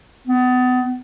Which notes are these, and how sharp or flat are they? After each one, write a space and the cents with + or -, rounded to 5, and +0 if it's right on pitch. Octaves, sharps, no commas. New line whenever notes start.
B3 +30